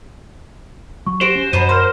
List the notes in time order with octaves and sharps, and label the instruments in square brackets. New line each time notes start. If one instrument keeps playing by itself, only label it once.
[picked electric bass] F#3 [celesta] C#6
[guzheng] F#4 [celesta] G4 D7 E7 [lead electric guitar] C5
[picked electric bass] C#4
[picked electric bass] F#2 [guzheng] B2 F#3 B3 [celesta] D#7
[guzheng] A#4 [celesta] C6 F6